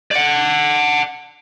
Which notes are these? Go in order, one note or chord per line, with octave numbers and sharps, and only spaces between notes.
D5 F#5